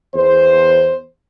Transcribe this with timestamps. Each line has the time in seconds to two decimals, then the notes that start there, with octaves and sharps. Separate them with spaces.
0.15 E2 C5